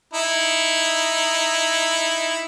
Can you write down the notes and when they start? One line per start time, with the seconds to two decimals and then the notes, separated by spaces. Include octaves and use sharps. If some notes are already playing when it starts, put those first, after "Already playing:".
0.13 D#4 E4